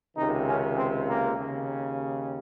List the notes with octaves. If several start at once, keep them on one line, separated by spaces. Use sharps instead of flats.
C#2 C3 D#3 D#4
C#4
C4
A#3
D#2 C#3